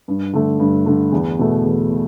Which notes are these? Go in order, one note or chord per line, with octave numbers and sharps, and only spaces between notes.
G2
D3 A3
G2
D3 A3
E2
B2 A3
E2
B2